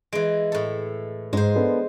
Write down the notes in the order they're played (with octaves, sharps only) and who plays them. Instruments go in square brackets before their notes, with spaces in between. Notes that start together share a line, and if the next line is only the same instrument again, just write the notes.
[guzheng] E3 G#3 [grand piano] D7
[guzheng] A2 A4
[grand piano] G#2 [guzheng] G#3 C5
[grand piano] B3 D4 A4